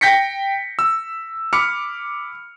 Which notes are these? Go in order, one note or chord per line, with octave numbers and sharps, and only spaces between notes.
G5 G6 A#6 B6 C#7
E6
B5 D6 F6 C#7